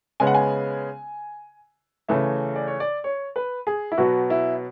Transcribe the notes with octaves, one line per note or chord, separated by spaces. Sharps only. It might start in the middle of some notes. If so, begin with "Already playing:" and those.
C#3 G#3 B3 G#5
F#5
G#5
C#3 E3 A3 E5
D5
C#5
D5
C#5
B4
G#4
E4
B2 F#3 B3 F#4
E4